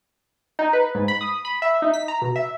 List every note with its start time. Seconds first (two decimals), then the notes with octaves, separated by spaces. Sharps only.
0.59 D#4
0.73 B4
0.95 G#2
1.08 B5
1.21 D#6
1.45 B5
1.62 E5
1.82 D#4
1.94 B6
2.08 A#5
2.22 B2
2.36 E5